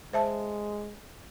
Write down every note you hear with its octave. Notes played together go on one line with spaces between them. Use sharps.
G#3 C5 E5 A5